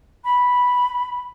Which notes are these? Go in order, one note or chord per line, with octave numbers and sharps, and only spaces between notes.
B5